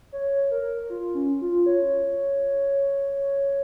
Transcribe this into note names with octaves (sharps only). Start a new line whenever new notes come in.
C#5
A#4
F4
C#4
F4
C#5